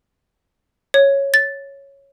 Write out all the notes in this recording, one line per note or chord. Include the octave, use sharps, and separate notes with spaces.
C#5
A6